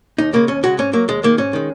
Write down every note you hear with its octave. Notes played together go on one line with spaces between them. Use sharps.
D#2 D#4
C#3 G#3 A#3
D#2 C#4
C#3 G#3 F#4
G#2 C#4
F#3 A#3
D#2 G#3
D#3 G#3 A#3
G#2 C#4
D#3 G#3